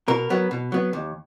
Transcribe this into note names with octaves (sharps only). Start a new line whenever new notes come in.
B2 A#4
F#3 B3
B2
F#3 B3
D#2